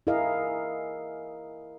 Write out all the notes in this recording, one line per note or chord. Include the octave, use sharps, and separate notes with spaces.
E4 G#4 A#4 D#5 F5